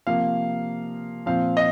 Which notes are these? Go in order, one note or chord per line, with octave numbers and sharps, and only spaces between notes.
C3 F3 A#3 F5
A#2 F3 C4 F5
D#5